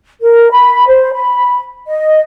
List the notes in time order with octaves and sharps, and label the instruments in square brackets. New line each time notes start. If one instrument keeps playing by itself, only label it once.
[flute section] A#4
B5
C5
B5
D#5